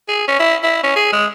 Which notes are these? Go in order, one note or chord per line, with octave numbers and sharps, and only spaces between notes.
G#4
C#4
E4
E4
C#4
G#4
G#3